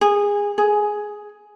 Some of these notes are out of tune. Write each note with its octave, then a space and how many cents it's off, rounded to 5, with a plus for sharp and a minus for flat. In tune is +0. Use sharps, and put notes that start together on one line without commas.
G#4 -20
G#4 +5